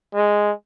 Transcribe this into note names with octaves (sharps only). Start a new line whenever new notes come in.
G#3